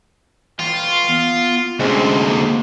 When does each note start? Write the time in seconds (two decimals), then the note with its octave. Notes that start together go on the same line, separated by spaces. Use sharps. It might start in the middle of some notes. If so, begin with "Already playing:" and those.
0.59 E3 F4 G5
1.09 B3
1.80 D2 C3 G#3 C4 C#4
2.20 A#3